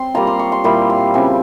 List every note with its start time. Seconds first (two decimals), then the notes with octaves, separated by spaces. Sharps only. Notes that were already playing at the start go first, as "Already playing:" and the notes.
Already playing: C4 C6
0.14 G3 A#3 F4 A#5
0.27 C6
0.39 C#6
0.52 C6
0.64 A#2 G3 C4 E4 C6
0.90 C6
1.14 C#3 F3 C4 E4 G#5